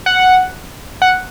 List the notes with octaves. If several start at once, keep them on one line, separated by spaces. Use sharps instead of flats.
F#5
F#5